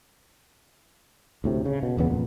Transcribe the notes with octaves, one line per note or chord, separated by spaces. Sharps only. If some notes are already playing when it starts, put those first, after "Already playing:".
D2 A2 C3
C#3
B2
E1 E2 C#3 B3
F2 A#2